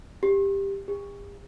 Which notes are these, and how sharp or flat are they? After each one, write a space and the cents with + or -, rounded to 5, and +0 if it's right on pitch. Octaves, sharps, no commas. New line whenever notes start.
G4 +10
G4 +45